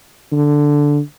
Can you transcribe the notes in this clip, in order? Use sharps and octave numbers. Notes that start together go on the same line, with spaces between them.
D3